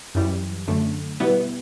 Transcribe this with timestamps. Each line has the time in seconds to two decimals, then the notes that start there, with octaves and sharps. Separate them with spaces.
0.15 F#2 E3 G3
0.68 F#2 D3 A3
1.20 B2 G3 B3 E4